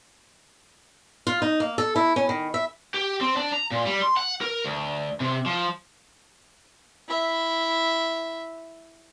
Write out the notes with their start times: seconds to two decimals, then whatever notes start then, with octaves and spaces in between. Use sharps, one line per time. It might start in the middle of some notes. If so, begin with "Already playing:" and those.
1.27 F4
1.42 D#4
1.60 A#3
1.78 A4
1.96 E4
2.16 C#4
2.29 D#3
2.54 E5
2.94 G4
3.21 C4
3.37 D4
3.52 A#5
3.71 A#2
3.86 G3
4.02 C6
4.17 F#5
4.41 A#4
4.64 D2
5.20 C3
5.46 F3
7.08 E4 E5